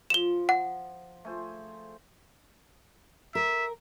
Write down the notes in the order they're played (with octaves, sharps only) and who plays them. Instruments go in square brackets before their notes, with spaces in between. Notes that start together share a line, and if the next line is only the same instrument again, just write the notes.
[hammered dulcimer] F3 [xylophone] E7 G7
[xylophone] F#5
[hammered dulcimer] A3 G#4 C5
[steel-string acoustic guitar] A#4 [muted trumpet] E5